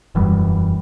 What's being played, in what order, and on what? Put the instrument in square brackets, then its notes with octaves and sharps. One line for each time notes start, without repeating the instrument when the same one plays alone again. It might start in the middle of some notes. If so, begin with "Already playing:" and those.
[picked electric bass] E1 F#2 E3 G3